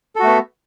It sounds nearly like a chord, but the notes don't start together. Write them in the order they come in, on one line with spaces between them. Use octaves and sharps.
A4 F#4 A3 B3